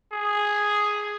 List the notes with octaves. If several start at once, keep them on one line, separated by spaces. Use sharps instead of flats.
G#4